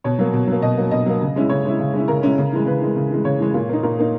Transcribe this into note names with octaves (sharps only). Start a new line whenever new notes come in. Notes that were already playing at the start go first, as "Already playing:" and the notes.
B2 C#5
F#3 A#3
B2
F#3 A#3
B2 D#5
F#3 A#3
B2 D#5
F#3 A#3
C#3
G#3 C#4 E4
C#3 C#5
G#3 C#4 E4
C#3
G#3 C#4 E4
C#3 A#4
G#3 C#4 E4
C#3
E3 G#3
C#3 B4
E3 G#3
C#3
E3 G#3
C#3 C#5
E3 G#3
A#2
A#3 D#4
A#2 A#4
A#3 D#4